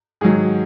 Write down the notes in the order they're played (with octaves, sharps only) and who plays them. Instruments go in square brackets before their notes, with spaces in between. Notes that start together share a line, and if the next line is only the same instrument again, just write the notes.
[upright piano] G#2 D#3 F#3 G#4